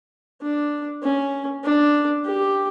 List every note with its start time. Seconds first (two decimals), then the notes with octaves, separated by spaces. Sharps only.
0.42 D4
1.03 C#4
1.64 D4
2.25 G4